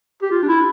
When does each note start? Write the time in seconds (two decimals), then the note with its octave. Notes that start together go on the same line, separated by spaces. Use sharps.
0.22 G4
0.31 F4
0.43 D4
0.48 E4